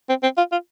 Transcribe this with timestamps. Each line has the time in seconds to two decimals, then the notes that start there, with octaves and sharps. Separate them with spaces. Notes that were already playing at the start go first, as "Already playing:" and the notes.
0.09 C4
0.23 C4
0.37 F4
0.52 F4